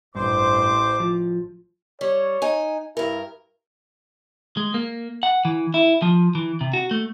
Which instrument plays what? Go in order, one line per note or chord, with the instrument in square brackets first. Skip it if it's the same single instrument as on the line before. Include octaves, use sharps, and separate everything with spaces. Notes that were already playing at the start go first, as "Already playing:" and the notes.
[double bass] A1 [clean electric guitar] G2 [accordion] C5 [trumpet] D6
[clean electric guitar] F3
[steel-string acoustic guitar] G3 [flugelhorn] C#5
[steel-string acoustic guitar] D#4 G#5
[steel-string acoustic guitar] G2 A#4 [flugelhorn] E4
[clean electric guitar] G#3
A#3
F#5
E3
E4
F3
E3
C3
F#4
A3